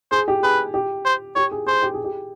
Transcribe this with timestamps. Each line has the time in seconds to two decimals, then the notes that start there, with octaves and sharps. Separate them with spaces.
0.11 G#4 C5
0.28 G4
0.43 G#4 B4
0.74 G4
1.05 C5
1.36 G4 C#5
1.51 G#4
1.66 G#4 C5
1.82 G4
1.94 G#4
2.04 G4